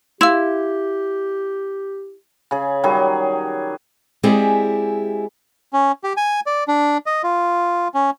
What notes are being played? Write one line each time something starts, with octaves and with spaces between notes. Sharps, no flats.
E4 G4 F5 C6
C#3 G#4
D#3 F#3 G3 G#4
G#3 C4 E4 G4 G#4 D5
C#4
G4
G#5
D5
D4
D#5
F4
C#4